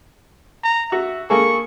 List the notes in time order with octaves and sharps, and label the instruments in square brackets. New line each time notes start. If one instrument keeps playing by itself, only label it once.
[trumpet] A#5
[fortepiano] F#4 [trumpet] E5
[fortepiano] A#3 G#4 A4 [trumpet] C#6